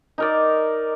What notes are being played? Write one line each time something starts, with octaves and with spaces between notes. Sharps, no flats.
D#4 A#4 D5